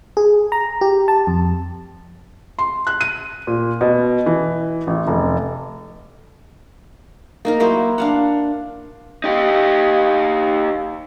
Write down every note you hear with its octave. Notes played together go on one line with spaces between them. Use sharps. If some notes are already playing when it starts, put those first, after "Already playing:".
G#4
A#5
G4
A5
F2
C6
F#6
D#7
A#2
B2
E3
A1
F1
A#3 D#4 A#4
F#3 A#3 E4 C5
D4 F5 F#5
D#4 G4